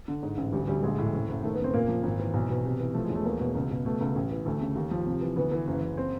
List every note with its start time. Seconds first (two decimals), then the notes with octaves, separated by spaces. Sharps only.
0.08 D3
0.23 G#2
0.37 A1
0.53 D2 G3
0.68 D2 G3
0.83 A#1 G#3
0.98 A2
1.13 F#1
1.29 F#1
1.43 D#3 A3
1.54 B3
1.59 F#1 C4
1.73 A#2 A#3
1.88 F3
2.03 G#1
2.19 E3
2.34 B1
2.50 B2
2.65 C3
2.80 E3
2.94 F3 A3
3.05 G#3
3.10 E1 A3
3.25 E2 A#3
3.40 B2
3.55 C#2
3.70 B2
3.85 B2 A3
4.00 C#2
4.16 A1
4.31 E3
4.46 D2 A3
4.61 C#3
4.76 D#2
4.91 F3
5.06 C3
5.21 E3
5.36 D2 B3
5.52 E3
5.67 F#1
5.82 F#1
5.97 C4